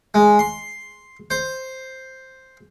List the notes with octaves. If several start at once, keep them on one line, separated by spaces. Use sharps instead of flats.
G#3
C6
C5